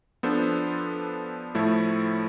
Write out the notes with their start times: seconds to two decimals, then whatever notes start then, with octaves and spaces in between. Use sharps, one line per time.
0.23 F3 B3 D4 A4 C5
1.55 A2 F3 A3 E4